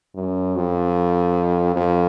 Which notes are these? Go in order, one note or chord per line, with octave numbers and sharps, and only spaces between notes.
F#2
F2
F2